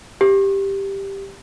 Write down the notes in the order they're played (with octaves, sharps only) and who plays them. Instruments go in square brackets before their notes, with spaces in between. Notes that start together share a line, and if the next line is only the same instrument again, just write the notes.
[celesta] G4